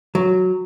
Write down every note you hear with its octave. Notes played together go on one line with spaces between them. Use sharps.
F#3